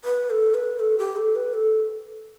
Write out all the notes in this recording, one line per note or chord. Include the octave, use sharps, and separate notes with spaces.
B4
A4
B4
A4
G4
A4
B4
A4